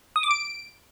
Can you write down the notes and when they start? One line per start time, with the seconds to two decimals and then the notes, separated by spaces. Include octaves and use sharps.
0.16 D#6
0.23 D6
0.31 D7